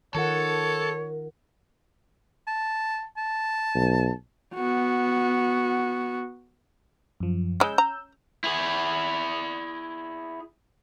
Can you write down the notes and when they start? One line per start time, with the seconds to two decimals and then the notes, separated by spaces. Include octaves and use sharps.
0.15 D#3 F4 A4 A#4 C#5 F#5
2.47 A5
3.17 A5
3.75 B1
4.55 B3 F#4
7.20 F#2 F3
7.60 C#3 G#3 C#4 E6 G6
7.78 A#5
8.44 E4 G#4